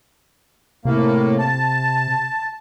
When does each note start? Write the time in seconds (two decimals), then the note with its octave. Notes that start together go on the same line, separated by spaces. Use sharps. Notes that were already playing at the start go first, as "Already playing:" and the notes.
0.85 A2 C3 A#3
1.39 A5